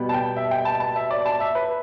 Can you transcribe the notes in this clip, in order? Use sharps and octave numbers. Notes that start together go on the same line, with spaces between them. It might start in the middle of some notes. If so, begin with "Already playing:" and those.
Already playing: B2 G3 B3
A5
G5
E5
G5
A5
A5
E5
D5
A5
E5
B4